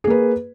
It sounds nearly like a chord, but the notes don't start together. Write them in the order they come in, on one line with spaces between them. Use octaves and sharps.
G#4 A#3 B4